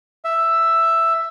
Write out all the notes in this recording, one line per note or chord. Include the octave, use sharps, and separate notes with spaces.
E5